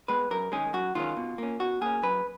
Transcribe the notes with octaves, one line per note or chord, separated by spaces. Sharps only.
G#3 B3 B4
F#2 A#4
D#3 G#3 C#4 G#4
F#2 F#4
D#3 G#3 C#4 F4
B2
A#3 C#4
B2 F#4
A#3 C#4 G#4
F#2 B4